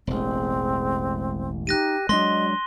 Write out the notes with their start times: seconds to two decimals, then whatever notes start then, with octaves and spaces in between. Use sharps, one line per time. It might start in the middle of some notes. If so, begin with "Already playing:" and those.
0.07 E1 A1 G#3 C4
1.67 D#4 G4 F#6 A#6 D#7
2.09 F#3 G#3 A#3 D4 D#5 C6 A#6 G7